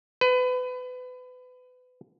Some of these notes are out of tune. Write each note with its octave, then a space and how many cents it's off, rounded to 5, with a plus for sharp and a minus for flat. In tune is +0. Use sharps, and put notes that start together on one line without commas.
B4 +30